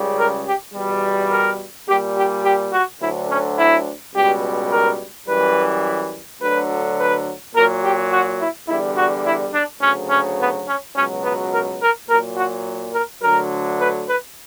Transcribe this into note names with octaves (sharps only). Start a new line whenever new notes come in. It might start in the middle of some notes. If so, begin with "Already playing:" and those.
Already playing: C#2 C#3 G3
A#4
G4
E2 B2 G3
A#4
A#2 G3 G4
G4
G4
F#4
D2 D3 F#3 E4
C#4
E4
C#2 B2 G3 G4
A#4
F#2 E3 G3 B4
D2 D3 F#3 B4
B4
A#2 F#3 A#4
G4
F#4
E4
E2 D3 G3 E4
F#4
E4
D4
D2 C#3 F#3 C#4
C#4
B3
C#4
C#2 B2 F#3 C#4
B3
A#4
A#4
A#2 F#3 A#4
F#4
A#4
D2 D3 F#3 A#4
B4
B4